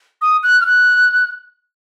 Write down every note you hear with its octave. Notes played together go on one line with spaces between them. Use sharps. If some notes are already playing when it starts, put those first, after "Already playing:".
D#6
F#6
F6
F#6